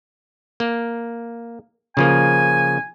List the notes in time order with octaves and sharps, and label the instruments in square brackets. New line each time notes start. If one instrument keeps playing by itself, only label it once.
[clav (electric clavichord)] A#3
[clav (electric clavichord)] C#3 F3 A#3 [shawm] G#5